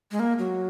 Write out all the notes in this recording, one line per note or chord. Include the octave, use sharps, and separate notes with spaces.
G#3
A#3
F#3